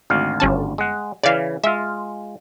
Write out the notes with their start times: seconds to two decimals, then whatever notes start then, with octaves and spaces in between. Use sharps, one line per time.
0.10 G#1 D2 F5
0.40 G1 C#4 A5
0.78 G#3 F#5
1.24 C#3 E3 D5 F5
1.64 G#3 F4 E5